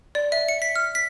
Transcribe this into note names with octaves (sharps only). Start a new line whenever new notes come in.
D5
E5
C#7
B6
F6
B6